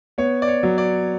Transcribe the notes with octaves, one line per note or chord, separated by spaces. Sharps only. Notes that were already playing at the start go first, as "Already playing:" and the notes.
B3 C#5
D5
C#5
F#3
D5